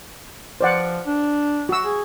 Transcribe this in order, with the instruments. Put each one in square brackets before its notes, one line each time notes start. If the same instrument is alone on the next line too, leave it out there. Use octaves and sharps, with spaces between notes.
[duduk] F3 [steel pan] C5 D5 F#5
[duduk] D4
[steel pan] F#4 E6
[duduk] G#4